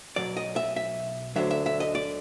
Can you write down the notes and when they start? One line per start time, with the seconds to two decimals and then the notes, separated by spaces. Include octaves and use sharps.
0.16 B1 B2 F#3 D5
0.37 D#5
0.56 E5
0.76 E5
1.36 D2 D3 F#3 E5
1.51 E5
1.66 E5
1.80 D#5
1.95 D5